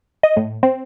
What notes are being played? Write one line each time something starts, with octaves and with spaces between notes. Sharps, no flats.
D#5
A2
C4